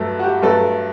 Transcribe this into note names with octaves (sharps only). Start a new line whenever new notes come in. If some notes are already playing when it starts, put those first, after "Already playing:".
Already playing: G2 F#3 A3 A4
F#4
G4
G2 F#3 A3 A4